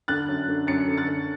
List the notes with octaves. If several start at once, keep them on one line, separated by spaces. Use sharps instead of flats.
D3 F#6 A6
F#2
D3
F#2 A6 C#7
D3
F#6 A6
D3